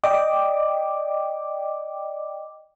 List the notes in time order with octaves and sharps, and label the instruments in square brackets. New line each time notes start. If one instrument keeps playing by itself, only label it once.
[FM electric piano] D5 D#5 G5 D6